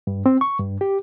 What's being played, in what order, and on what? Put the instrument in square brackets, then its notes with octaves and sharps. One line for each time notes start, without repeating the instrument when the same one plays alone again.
[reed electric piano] G2
C4
C#6
G2
G4